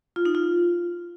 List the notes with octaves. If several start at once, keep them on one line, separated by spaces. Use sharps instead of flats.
F4
D#4
F4